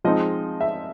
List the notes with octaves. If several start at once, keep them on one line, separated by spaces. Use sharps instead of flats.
F3 G#3 C4 D#4 D#5
E5